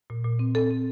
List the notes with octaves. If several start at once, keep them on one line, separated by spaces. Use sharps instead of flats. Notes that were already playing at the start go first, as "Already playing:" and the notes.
A#2
A#2
C4
C4 A4
C4